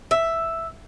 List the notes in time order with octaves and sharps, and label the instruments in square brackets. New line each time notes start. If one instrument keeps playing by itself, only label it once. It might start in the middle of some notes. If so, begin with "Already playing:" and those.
[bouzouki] E5